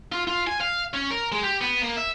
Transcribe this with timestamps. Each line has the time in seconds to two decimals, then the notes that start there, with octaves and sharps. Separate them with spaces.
0.12 F4
0.28 F4
0.47 G#5
0.61 F5
0.94 C#4
1.11 A#4
1.32 G#3
1.43 G4
1.61 B3
1.81 A#3
1.97 E5